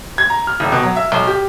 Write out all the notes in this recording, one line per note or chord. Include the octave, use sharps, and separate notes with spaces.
G#6
A#5
F6
D#1
B2
F#3
E5
B1
G4